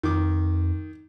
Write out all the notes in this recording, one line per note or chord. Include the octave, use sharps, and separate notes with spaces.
F2 D#3 D6